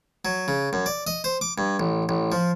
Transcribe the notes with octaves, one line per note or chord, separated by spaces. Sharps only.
F#3
C#3
F#2
D5
D#5
C5
D6
G2
A1
A1
F3